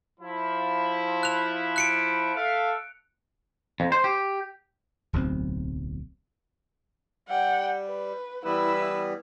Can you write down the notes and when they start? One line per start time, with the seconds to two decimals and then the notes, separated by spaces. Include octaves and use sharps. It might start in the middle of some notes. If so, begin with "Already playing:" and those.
0.20 F3 E4
1.23 F#6 F7
1.76 F#6 C#7 D7
2.36 A4 E5 F5
3.80 F2
3.92 C5
4.04 G4
5.13 D1 B1 B2 C4
7.29 G3 F#5 G5
7.87 B4
8.45 E3 G3 B3 E4 B4 E6